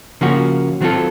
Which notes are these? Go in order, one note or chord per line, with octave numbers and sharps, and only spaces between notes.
C#3 F3 A#3 C#4 F#4
D#3 F#3 C4 F4 A4